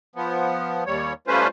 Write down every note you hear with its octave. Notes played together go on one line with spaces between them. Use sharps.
F3 B3
D#2 G3 C#5
G3 A3 C#4 F4 B4 C5